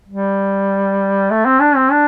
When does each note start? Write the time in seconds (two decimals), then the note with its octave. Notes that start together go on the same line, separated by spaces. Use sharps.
0.08 G3
1.31 A3
1.46 C4
1.61 D4
1.76 C4
1.92 D4